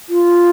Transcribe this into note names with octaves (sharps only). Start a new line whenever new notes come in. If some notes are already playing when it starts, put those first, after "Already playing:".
F4